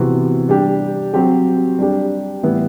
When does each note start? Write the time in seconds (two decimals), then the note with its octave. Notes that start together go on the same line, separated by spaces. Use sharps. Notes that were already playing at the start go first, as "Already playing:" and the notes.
Already playing: C3 E3 B3 F#4
0.49 G3 D4 G4
1.14 F#3 C4 G4
1.79 G3 D4 G4
2.43 A2 E3 G3 B3 E4